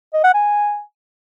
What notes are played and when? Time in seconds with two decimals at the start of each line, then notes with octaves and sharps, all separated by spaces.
0.14 D#5
0.24 F#5
0.34 G#5